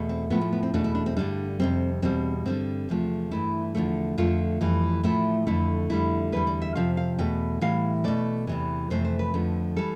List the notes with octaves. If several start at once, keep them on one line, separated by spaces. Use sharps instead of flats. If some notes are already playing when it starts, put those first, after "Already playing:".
Already playing: E2 B2 A3
C4
A2 F3 A3 B3
A3
B3
C4
E2 B2 A3 D4
E4
D4
C4
G2 D3 G3 D4
F2 C3 G3 C4
E2 B2 G3 C4
G2 D3 G3 C4
E2 C3 F3 A3
G2 E3 A3 E4
E2 D3 F3 A3
F2 D3 A3 F4
F2 E3 G3
A2 F3 A3 E4
F2 D3 A3 E4
F2 D3 G3 E4
E2 D3 G3 B4
D5
E5
F2 C3 F3 F5
F5
E2 B2 A3 G5
A2 E3 G3 F5
B2 A3 D5
E2 C3 E3
F2 C3 E3 A3 C5
C5
B4
F2 D3 F3 A3
E3 G3 A4